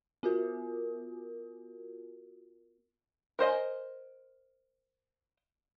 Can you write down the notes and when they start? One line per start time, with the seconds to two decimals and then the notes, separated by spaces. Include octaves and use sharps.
0.23 B3 F4 F#4 A#4
3.39 A#4 C5 D#5 G#5